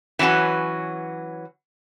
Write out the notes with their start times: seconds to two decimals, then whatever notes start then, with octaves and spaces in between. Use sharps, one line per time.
0.19 E3 F#3 C#4 F#4 B4